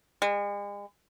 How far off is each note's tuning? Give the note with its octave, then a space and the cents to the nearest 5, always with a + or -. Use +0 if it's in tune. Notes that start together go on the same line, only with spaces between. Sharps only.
G#3 -40